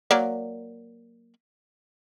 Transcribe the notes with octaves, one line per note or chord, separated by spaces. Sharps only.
F#3 A#3 D5